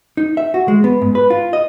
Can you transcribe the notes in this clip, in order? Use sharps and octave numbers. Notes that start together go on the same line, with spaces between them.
D#4
E5
F#4
G#3
B3
G#2
B4
F4
D#5